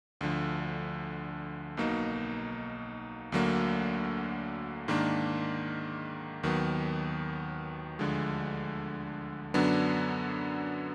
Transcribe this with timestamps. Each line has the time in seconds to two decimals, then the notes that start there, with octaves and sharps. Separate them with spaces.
0.21 D2 D3 F3
1.77 B1 B2 A#3 D#4
3.32 D2 D3 F#3 A#3
4.88 G#2 D#3 A#3 D4
6.43 D#2 D#3 F#3 B3
7.99 D2 D3 F3 G#3
9.54 F#2 D3 F#3 B3 D4